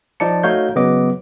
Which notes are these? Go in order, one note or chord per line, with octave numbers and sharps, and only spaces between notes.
F3 D#4 D5 A5 C#7
A3 D#4 F#4 C#5 F5 G6
C#3 F#3 B3 D#5 D6